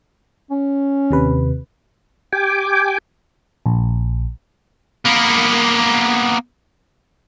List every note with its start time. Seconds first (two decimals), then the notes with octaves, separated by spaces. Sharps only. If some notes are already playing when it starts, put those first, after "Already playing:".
0.51 C#4
1.10 D#2 C3 B4
2.32 G4 G5 G#5 D6
3.66 A#1
5.06 A#3 B3